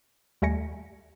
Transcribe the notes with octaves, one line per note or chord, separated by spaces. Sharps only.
D#2 G3 A3 G#5 A#6 C#7